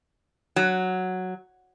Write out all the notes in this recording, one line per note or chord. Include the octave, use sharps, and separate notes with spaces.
F#3